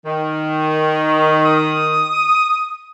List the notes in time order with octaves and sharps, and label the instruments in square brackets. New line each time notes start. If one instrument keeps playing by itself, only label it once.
[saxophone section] D#3
[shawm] D#6